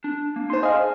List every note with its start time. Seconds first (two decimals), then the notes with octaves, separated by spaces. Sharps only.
0.04 D4
0.36 A#3
0.50 D#4 C5 A5 C6
0.63 G#4 D#5 F5 G#5